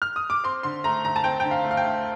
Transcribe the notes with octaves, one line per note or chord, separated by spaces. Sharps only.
F6
D#6
D6
C4 C6
D3 C6
A3 A#5
D2 A#5
A5
C4 G5
D3 G5
F5
A3
F5
G5
D2